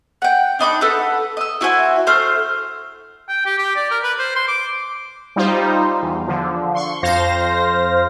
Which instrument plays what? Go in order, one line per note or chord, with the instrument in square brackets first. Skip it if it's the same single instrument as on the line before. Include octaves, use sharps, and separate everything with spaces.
[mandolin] F#5 G5
D4 D#4 B5 D6
A4 B4 F#5
D#5 E6
E4 F#4 C5 G#5
A3 C5 F6
[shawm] G5
G4
G4
D5
A#4
B4
C5
C6
D6
[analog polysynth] G3 D#4 F4 C5
E2
D3 F3
C6 C#6
F2 C5 F5 A#6